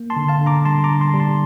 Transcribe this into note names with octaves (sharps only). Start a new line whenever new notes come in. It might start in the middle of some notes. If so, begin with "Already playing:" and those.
Already playing: A#3
A5 C6
D3
F5 A5
D3
A#5 D6
G3 A5 C6
A#5 D6
D3
A5 C6
G3
A5 C6